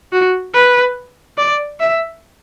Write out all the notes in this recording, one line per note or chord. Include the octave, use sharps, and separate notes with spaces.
F#4
B4
D5
E5